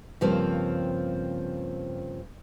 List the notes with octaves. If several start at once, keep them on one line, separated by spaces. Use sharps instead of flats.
G2 C#3 F3 A#3 C4